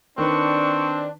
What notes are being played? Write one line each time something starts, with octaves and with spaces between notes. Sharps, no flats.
D#3 C4 D4 B4 C#6